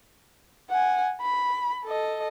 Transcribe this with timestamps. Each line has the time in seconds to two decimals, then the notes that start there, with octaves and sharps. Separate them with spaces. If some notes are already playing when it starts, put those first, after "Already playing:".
0.70 F#5 G#5
1.21 B5
1.85 A4 D#5